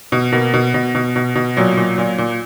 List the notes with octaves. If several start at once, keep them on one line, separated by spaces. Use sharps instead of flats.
B2
B2 A#3
B2
B2
B2
B2
B2
A#2 F#3
A#2
A#2
A#2